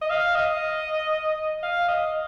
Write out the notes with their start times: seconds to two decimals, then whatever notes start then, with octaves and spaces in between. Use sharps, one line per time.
0.02 D#5
0.10 F5
0.35 D#5
1.63 F5
1.88 D#5